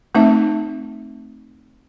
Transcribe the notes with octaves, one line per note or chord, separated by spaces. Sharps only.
A3 C4 D#4 E5